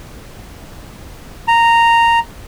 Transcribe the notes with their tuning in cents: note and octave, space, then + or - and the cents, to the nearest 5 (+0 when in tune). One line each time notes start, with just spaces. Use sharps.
A#5 -10